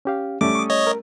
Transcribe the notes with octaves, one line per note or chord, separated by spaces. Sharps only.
C#4 G4 F5
G3 A3 C#4 D6
C#6 D#6
C#5 D#5
A#4